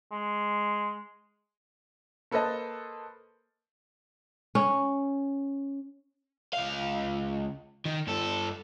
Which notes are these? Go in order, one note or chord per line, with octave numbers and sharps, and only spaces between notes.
G#3
A#3 A4 B4 C5 D#5 A5
C#4
C#2 F5
D#3
G2 A4